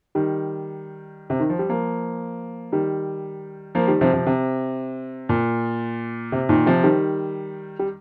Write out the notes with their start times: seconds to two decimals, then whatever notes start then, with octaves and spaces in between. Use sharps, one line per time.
0.15 D#3 G3
1.30 C3
1.40 D#3
1.50 F3
1.59 G3
1.69 F3 A#3
2.72 D#3 G3
3.75 F3 A#3
3.88 D#3 G3
4.01 C3 F3
4.13 C3 F3
4.26 C3
5.29 A#2
6.32 C3
6.49 A#2 D#3
6.66 C3 F3
6.84 D#3 G3
7.79 G3